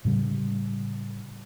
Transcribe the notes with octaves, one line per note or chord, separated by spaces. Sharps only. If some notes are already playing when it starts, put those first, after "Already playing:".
A2 C#3 G3